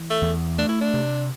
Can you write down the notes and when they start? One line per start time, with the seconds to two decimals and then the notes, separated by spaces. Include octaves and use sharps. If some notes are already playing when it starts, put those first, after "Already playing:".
Already playing: E3
0.10 A3
0.22 E2
0.58 A3 D4
0.69 E4
0.81 D4
0.94 C3